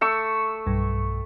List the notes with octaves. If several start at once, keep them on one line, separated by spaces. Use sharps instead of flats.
A3 C#6 E6
B1 G2